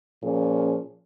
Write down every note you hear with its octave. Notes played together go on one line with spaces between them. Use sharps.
A#2 F3 C#4 G#4